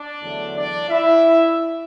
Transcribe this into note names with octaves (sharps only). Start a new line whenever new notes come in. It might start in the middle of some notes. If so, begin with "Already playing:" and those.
Already playing: D4 D5
E2 D3 F#3 A3
D4 D5
E4 E5